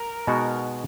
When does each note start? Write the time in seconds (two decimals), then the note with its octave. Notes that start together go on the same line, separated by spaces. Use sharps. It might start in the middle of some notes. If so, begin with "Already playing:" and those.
Already playing: A#4
0.27 B2 G#3 B3 D#4 F#4